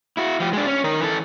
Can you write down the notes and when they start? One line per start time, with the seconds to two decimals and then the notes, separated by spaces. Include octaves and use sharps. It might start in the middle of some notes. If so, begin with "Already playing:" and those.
0.17 E4 F#4
0.40 F3 G4
0.53 G#3 D4
0.67 C#4
0.84 D#3 A#4
1.01 E3 A4